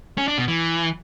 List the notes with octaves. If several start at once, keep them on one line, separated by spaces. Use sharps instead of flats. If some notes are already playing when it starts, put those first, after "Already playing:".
C#4
D4
B2
E3